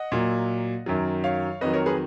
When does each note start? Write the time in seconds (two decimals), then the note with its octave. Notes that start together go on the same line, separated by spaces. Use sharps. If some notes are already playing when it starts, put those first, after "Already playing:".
Already playing: D#5 F#5
0.12 A#2 F#3
0.86 F#2 D#3 F#3
1.24 C#5 F5
1.61 F2 D#3 F#3 B4 D#5
1.73 A#4 C#5
1.86 G#4 B4